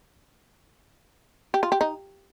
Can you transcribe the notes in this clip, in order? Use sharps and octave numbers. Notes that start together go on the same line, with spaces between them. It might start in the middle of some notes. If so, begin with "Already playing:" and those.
G4
F4
G4
D#4